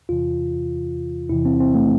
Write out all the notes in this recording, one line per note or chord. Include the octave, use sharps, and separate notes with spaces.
E2 C3 E3 F4
E2 C3 E3 E4
C4
C4
A3